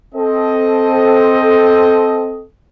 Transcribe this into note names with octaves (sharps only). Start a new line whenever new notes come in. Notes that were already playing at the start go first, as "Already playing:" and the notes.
C4 A4 D#5